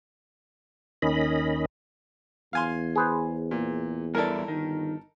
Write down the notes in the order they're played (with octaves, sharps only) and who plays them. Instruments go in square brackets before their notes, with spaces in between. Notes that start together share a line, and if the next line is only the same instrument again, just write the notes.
[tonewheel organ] D#2 D#3 C#4 D#5 B5
[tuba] E2 [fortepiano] F5 G#5 C6
[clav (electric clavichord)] G#4 B4 C5
[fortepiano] A#2
[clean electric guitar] G2 E4 D5 [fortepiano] A4 A#4
[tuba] G1 [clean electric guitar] D#3